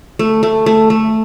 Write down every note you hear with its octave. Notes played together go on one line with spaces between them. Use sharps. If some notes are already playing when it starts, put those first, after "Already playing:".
A3
A3
A3
A3